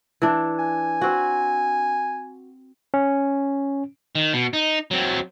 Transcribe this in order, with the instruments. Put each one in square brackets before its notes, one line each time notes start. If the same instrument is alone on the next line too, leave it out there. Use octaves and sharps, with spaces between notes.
[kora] E3 D4
[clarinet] G#5
[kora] C4 F#4
[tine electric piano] C#4
[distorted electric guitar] D#3
B2
D#4
F#3 C4